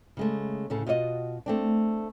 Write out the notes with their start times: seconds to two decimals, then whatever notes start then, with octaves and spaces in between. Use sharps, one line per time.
0.17 C#3 G#3 A3
0.70 D2 A2 C#3 A3
0.87 B2 F4 F#4 C#5 D#5
1.46 A3 C4 D4